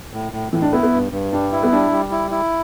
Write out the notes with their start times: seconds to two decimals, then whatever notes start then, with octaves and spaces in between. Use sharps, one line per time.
0.13 A2
0.32 A2
0.52 A2 E3
0.62 D4
0.72 B3 E4
0.83 B3
0.93 G2
1.12 G2
1.33 G3 D4
1.52 E4
1.63 B3
1.72 G3 D4
1.92 G3
2.11 E4
2.31 E4